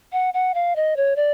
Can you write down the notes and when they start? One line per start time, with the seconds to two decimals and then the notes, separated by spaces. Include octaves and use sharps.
0.12 F#5
0.34 F#5
0.54 F5
0.76 D#5
0.96 C#5
1.16 D5